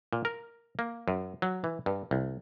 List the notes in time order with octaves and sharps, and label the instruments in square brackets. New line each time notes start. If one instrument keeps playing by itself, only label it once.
[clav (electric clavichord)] A#2
A#4
A#3
F#2
F#3
E3
G2
C2